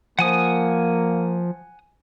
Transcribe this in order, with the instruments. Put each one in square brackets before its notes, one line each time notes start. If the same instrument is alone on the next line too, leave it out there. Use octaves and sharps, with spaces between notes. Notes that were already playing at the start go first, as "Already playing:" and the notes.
[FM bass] F3 [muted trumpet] A#3 [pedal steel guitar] F#5 G#5 D#6